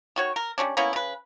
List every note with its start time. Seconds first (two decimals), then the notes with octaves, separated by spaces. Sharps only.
0.16 D#3 F#4 C#5
0.36 A#4
0.58 G3 A#3 C#4 D4
0.77 A#3 B3 C#4 E4
0.93 C#3 B4